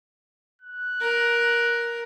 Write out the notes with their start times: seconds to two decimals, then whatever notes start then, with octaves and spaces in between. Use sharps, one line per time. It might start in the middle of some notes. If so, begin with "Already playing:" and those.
0.62 F#6
1.01 A#4